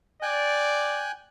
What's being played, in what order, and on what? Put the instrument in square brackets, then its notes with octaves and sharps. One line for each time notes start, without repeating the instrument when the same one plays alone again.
[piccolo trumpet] D5 [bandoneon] G5 G#5 F#6